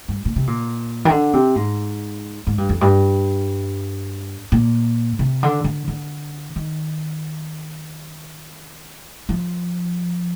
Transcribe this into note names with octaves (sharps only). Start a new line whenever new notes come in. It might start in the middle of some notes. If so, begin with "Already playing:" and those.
G2
A#2
C3
A#2
D#3
D3
C3
G#2
G#2
G2
F2
G2
A#2
C3
D3
D3
D3
D#3
F3